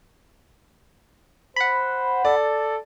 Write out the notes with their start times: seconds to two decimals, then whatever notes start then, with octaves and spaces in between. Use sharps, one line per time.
1.56 C5 F#5 B5
2.25 A4 D5